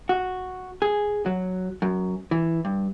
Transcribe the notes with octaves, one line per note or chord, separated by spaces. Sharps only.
F#4
G#4
F#3
F#2
E3
G2